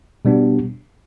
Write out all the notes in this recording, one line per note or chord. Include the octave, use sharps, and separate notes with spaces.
B2 G3 B3 D4